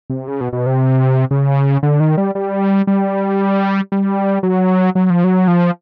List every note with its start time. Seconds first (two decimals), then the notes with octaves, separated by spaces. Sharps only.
0.10 C3
0.28 C#3
0.41 B2
0.53 B2
0.66 C3
1.31 C#3
1.83 D3
2.00 D#3
2.17 G3
2.35 G3
2.87 G3
3.92 G3
4.43 F#3
4.95 F#3
5.10 F3
5.24 F#3
5.48 F3